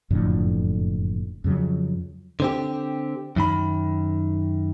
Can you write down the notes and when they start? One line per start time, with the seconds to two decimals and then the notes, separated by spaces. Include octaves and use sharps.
0.10 F#1 F2 A2 D3
1.44 F2 C#3 F#3
2.40 D3 C4 G4
3.36 F#2 D#3 B5